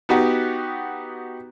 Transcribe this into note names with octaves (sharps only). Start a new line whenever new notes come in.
B3 D#4 F#4 G4 F#5